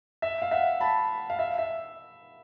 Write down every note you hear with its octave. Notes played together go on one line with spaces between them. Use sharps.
E5
F5
E5 F#5
A5 B5
F5
E5
E5